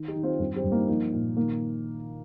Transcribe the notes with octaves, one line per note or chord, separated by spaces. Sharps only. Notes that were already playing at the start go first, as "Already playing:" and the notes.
Already playing: D#3
D#4 G4
D#3
C4 F4
G2 G3 C4
G3 C4
G2
A#3 D#4
F3 A#3 D#4
A#2
D#3 A#3